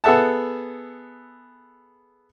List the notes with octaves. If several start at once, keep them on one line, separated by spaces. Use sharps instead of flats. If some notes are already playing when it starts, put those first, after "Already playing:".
B3 G#4 A4 E5 F#5 A5